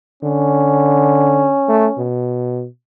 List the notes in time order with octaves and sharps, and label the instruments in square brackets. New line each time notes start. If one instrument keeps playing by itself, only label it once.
[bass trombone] D3 [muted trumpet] C#4
[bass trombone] A3
B2